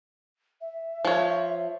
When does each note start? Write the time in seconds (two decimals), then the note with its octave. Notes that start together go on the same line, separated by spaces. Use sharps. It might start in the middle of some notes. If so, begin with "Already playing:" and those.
0.61 E5
1.05 F3 C#5